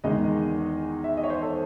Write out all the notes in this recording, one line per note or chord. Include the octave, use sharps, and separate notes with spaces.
E2 D#3 G#3 D#4 D#5
E5
D#5
C#5
C5
A4